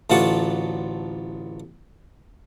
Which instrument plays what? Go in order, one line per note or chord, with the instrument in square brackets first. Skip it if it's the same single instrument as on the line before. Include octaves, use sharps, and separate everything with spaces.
[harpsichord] A1 D2 F4 F#5 A5 C#6